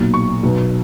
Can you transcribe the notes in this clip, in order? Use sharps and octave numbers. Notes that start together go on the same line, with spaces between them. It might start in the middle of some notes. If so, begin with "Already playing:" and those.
Already playing: B1 A#2
C#6
B1 B2